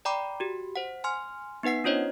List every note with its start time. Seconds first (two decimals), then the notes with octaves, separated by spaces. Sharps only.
0.05 D5 G5 A#5 B5 D6
0.40 F#4 G4
0.76 C5 F#5
1.04 G#5 C6 F6
1.63 B3 D#4 B4 F#5 C7
1.84 C#4 D4 F4 C5 C#5 D#5